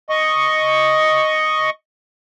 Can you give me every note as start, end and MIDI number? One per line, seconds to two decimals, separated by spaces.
0.10 1.70 75
0.10 1.70 85